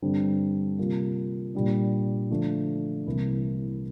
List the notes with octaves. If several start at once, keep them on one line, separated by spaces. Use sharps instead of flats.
G2 D3 G3 C4
C3 G3 A#3 F4
A#2 G3 D4
D3 F3 A3 D4
C2 C3 E3 A#3 E4